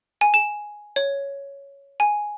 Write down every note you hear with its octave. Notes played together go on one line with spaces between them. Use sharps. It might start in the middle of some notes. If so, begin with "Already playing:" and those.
G#5
E7
C#5
G#5